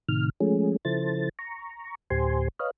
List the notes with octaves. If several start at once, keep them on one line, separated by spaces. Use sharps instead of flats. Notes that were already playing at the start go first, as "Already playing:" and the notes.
A2 C3 D#3 F6
F3 G#3 A3 C#4 G#4
C#3 F3 E4 A4 C5 A6
A#5 C#6
D2 A2 G4 C5 G#5 C6
B4 C#5 D#5 F5